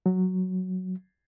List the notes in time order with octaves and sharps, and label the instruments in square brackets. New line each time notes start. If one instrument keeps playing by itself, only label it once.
[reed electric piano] F#3